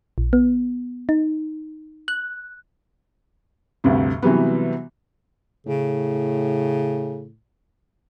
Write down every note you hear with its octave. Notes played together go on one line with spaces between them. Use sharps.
A#1
B3
D#4
F#6
D2 G2 C3
C3 E3 F#3 G3 B3
A2 C#3